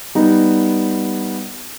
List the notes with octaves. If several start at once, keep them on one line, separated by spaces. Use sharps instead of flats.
G3 B3 D#4